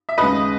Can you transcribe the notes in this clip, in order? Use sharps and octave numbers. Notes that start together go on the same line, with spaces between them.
E5
D#2 C#3 G#3 B4 D#5